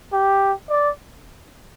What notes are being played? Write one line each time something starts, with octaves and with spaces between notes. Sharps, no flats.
G4
D5